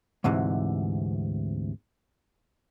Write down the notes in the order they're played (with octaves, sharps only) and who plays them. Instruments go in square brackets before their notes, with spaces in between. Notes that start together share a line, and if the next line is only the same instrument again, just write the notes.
[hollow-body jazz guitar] D2 G#2 C3 E3